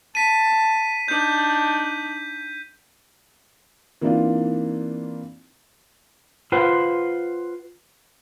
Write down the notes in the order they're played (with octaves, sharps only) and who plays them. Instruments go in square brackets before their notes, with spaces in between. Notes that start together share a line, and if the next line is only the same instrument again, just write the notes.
[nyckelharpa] A5 [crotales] B6 D#7
[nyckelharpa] D4 D#4 [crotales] G6
[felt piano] E3 A#3 C4 D4 D#4 F4
[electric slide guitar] F4 B4 C5 F#5